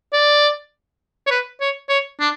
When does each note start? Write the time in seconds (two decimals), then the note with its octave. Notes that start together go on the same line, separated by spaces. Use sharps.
0.13 D5
1.27 C#5
1.30 B4
1.61 C#5
1.89 C#5
2.20 D4